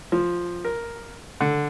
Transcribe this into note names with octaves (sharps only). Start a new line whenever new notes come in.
F3
A#4
D3